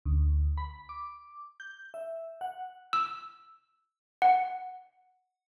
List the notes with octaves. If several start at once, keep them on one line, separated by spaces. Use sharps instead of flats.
D2
B5
D6
G6
E5
F#5
E6
F#5